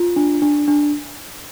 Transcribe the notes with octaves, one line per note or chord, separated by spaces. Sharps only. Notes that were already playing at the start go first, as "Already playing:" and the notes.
Already playing: F4
D4
D4
D4